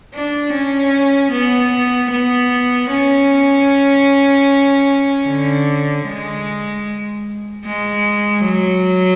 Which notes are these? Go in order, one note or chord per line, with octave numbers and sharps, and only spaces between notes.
D4
C#4
B3
B3
C#4
D3
G#3
G#3
F#3